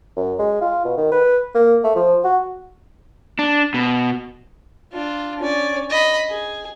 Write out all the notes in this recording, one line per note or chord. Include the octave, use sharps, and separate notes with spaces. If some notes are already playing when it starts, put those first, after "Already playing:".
F#2
G#3
F4
B2
D#3
B4
A#3
A3
F3
F#4
D4
B2
D4 F4
C#4 D5
D#5 B5
G#4